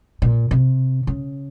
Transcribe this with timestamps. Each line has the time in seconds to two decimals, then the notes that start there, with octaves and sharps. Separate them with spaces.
0.22 A#2
0.51 C3
1.07 C#3